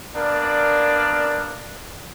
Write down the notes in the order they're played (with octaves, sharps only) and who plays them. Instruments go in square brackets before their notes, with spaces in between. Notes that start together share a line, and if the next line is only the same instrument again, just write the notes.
[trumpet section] A#3 B3 D4 A#4 D5